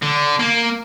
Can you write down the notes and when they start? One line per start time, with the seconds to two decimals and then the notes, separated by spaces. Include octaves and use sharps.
0.03 D3
0.40 A#3